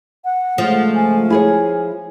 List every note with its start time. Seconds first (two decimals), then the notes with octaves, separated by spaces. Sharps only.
0.25 F#5
0.58 C#2 F3 G#3 A3
0.95 G#5
1.30 E4 G#4 C#5